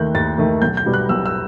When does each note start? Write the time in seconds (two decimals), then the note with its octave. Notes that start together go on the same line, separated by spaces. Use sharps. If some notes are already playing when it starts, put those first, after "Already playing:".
Already playing: D#2 D#3 A3 F#6 G6
0.15 D#2 A6
0.38 D#3 A3
0.62 B1 G6
0.77 G6
0.86 B2 G3 B3
0.94 F#6
1.09 B1 E6
1.26 E6